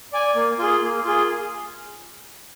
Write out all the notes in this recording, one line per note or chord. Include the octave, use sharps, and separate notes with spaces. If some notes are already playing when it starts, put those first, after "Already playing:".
D5 G#5
A#3
F4 G#4
A#3
F4 G#4